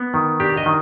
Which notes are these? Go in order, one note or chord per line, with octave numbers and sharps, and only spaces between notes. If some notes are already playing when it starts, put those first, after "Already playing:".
Already playing: B3
D#3
D4 G4
D#5
D#3